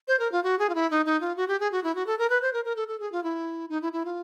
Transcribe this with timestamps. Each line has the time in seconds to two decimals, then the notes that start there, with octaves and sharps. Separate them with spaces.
0.08 C5
0.19 A#4
0.32 F4
0.44 F#4
0.59 G#4
0.70 F4
0.75 E4
0.91 D#4
1.06 D#4
1.21 F4
1.36 F#4
1.48 G4
1.60 G#4
1.72 F#4
1.84 E4
1.95 F#4
2.07 A4
2.19 A#4
2.30 B4
2.42 C5
2.53 A#4
2.65 A#4
2.76 A4
2.88 A4
3.00 G#4
3.12 F4
3.24 E4
3.70 D#4
3.82 E4
3.93 E4
4.05 F4